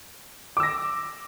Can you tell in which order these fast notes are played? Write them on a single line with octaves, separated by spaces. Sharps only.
D6 E6 A#6